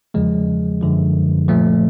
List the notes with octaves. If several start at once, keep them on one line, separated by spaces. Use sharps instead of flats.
E2 C#3 F3 G#3
F#2 D3 F3
A#2 F3 A3